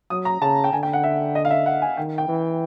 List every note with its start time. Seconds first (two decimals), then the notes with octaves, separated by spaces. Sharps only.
0.10 F#3 D#6
0.25 A#5
0.41 C#3 A5
0.64 G5
0.73 D3 G#5
0.83 G5
0.93 F#5
1.04 E5
1.35 D#5
1.45 F5
1.51 E5
1.66 F#5
1.82 G#5
1.97 D#3 G5
2.18 G5
2.28 E3